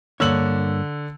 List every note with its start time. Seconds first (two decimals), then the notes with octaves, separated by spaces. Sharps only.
0.20 G2 D3 A#3 C#5 E6 F#7